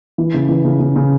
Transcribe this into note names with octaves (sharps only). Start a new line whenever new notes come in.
E3
C#3
E3
C#3
C#3
C#3